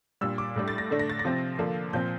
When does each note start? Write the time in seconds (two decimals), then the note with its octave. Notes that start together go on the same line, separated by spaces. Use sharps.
0.21 A#2 G3 D4 E6
0.38 D6
0.56 A2 G3 D4
0.68 A6
0.78 A#6
0.91 D3 A3 D4
0.99 A#6
1.10 A6
1.19 A#6
1.25 C3 F3 C4
1.59 D3 F3 A#3 D4
1.93 A#2 F3 C4 G6